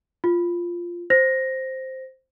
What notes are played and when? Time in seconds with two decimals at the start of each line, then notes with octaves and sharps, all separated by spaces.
0.24 F4
1.10 C5 A#6